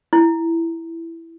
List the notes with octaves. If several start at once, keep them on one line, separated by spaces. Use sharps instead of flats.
E4